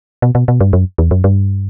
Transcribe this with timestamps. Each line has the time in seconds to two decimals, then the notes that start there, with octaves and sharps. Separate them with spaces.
0.22 B2
0.35 B2
0.48 B2
0.60 G2
0.73 F#2
0.98 E2
1.11 F#2
1.24 G2